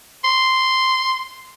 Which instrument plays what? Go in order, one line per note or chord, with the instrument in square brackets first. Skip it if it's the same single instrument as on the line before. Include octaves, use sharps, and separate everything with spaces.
[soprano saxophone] C6